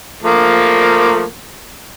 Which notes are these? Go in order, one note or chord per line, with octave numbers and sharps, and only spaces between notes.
F3 A3 A#3